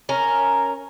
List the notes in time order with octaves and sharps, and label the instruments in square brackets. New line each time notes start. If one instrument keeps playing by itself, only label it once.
[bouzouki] C#4 A#4 [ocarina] A#5